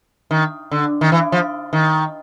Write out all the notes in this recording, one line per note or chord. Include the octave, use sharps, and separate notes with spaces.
D#3
D3
D#3
E3
F3
D#3